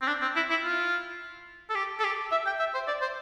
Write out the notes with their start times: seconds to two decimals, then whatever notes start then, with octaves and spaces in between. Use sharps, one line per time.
0.02 C4
0.07 D4
0.22 C4
0.36 E4
0.50 E4
0.64 F4
1.70 A4
1.75 G4
1.99 A4
2.04 G4
2.31 E5
2.46 G5
2.59 E5
2.74 C5
2.87 D5
3.01 C5